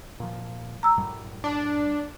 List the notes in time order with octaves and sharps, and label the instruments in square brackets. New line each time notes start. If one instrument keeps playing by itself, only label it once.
[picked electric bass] A#2 F3
[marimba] A#5 E6
[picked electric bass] F#2 A2 G3
[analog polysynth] D4